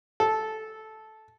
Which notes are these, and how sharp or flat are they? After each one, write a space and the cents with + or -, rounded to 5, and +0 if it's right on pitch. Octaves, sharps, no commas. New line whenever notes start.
A4 -10